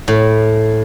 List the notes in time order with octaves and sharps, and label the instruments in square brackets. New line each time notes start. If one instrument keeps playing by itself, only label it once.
[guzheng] A2